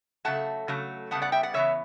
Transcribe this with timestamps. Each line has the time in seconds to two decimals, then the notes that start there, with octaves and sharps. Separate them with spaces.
0.25 C#3 F#3 A3 F#5 A5
0.68 C#3 F#3 A3
1.11 C#3 G3 B3 F#5 A5
1.22 D5 F#5
1.32 E5 G5
1.43 D5 F#5
1.54 C#3 E3 B3 C#5 E5